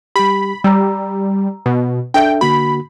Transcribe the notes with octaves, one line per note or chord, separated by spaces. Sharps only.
G3 G4 B5
G3 A#5 E6
B2
D4 A4 E5 G5
D3 A#3 F#4 B5